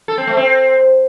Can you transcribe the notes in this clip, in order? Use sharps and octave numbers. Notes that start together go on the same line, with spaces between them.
A4
C4
A3
C4